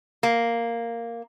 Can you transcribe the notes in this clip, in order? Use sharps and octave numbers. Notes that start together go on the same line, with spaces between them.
A#3